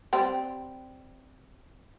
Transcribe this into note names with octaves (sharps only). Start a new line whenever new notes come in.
G3 C4